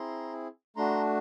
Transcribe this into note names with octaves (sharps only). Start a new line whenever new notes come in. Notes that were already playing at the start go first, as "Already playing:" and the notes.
Already playing: C4 E4 G#4 A#5 C6
A3 D4 F#4 A#5 C6